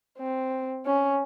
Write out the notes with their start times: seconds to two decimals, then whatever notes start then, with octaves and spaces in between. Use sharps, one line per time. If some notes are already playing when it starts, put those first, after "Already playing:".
0.19 C4
0.86 C#4